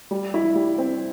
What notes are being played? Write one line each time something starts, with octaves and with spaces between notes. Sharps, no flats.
G3
E4
G3
C4